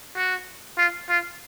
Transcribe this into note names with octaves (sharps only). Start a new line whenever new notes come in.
F#4
F4
F4